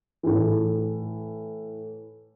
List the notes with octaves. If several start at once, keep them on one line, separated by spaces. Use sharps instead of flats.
A2 E3